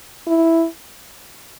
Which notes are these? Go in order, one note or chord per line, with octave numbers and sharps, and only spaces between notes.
E4